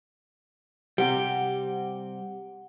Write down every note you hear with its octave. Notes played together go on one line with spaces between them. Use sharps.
C3 G3 G4 F#5